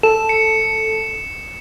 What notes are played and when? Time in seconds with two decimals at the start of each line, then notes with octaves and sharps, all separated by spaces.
0.03 A4 E7
0.29 C#7